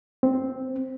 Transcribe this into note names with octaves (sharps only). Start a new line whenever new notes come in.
C4